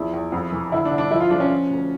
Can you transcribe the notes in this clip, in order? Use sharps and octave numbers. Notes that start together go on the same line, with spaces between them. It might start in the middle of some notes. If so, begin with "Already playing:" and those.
Already playing: E2 F3 E4
E2
F2
E3
D3 E4
D4
D3
D4
F3 E4
F4
F3 D4
C#4
F3
D2